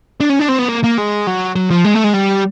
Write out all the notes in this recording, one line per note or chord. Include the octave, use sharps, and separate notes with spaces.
D4
C#4
D4
C4
B3
A#3
A#3
G#3
F#3
F#3
F3
G#3
A3
G#3
G3